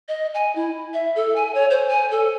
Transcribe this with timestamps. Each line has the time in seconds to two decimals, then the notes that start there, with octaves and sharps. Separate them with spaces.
0.08 D#5
0.35 G#5
0.55 E4
0.94 E5
1.16 A4
1.36 G#5
1.55 C#5
1.70 C5
1.89 G#5
2.11 A4